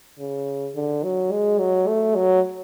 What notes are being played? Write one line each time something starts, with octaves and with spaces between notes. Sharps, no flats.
C#3
D3
F#3
G#3
F#3
A3
F#3